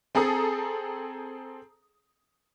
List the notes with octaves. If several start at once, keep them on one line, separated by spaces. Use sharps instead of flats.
C4 G#4 A4 A#5 D#6